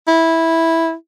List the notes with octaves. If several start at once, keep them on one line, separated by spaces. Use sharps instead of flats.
E4